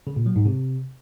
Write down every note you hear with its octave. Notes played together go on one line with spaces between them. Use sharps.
C#3
A#2
F#3
G#2
C3